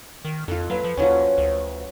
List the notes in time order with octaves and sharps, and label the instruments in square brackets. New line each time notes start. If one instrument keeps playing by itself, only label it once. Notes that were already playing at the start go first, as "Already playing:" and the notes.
[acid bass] D#3
[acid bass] F2 [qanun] F4 A4
[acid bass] F#3 [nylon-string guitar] B4 F5
[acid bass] F3
[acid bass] D#2 [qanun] F3 F#3 C#4
[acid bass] D2